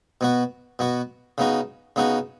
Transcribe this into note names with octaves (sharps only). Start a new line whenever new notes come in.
B2 B3 F#4
B2 B3 F#4
C#3 B3 D#4 F#4
C#3 B3 D#4 F#4